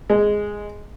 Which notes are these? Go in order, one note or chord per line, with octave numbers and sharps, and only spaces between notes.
G#3